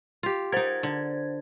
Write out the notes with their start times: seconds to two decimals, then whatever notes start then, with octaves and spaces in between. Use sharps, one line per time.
0.23 F4 G4
0.52 D#4 A#4 C5 G#6
0.83 D3